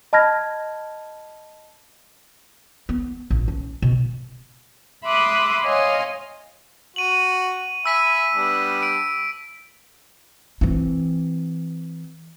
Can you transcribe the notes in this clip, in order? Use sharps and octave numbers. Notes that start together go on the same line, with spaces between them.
D#5 A5 B5 F6 G#6 A#6
B3
A#1
C#4
B2
E5 B5 C6 D6 D#6 F#6
C#5 D#5 F5 G#5 C6
F#4 D#7 F#7
E5 G#5 B5 E6 B6 D#7
G3 B3 D4
D7
E3 C4